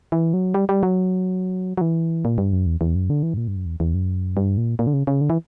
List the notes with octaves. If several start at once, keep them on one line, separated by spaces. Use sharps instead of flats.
E3
F#3
G3
G3
F#3
F#3
E3
A#2
G2
F#2
E2
E2
F#2
D3
E3
G2
A#2
G2
F#2
E2
E2
F#2
G2
A#2
A#2
D3
C#3
C#3
D3
E3